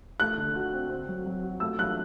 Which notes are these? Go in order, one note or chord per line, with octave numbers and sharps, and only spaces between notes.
A3 F#6
D3
F#4
C4
C4
F#3
F#3
F#4
A3 E6
F#3 F#6